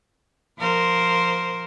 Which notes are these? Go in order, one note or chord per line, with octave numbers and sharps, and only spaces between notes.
F3 A#4 C5